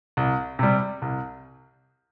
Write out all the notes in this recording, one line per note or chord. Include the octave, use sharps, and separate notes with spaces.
C2
C3 G3
C2